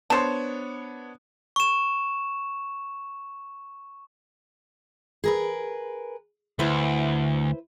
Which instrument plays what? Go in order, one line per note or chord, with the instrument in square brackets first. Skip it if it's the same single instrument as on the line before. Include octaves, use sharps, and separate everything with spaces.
[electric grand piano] B3 D4 C#5 [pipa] C5 A5
[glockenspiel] C#6 E7
[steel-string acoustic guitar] G#4 A#4 B4
[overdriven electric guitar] D2 [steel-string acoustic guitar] E4 B4 C5